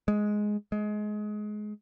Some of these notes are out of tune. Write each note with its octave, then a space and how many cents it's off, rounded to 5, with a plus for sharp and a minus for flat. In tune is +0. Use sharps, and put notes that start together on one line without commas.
G#3 +5
G#3 +20